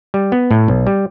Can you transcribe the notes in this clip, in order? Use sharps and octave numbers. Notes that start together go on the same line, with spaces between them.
G3
B3
A2
B1
G3